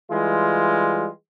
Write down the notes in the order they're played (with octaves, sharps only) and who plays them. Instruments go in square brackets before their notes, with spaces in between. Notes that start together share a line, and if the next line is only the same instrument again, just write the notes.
[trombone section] E3 G3 G#3 F4